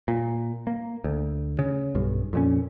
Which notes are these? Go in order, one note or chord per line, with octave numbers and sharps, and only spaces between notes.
A#2
A#3
D2
C#3
B1 G2
F2 A#2 C#4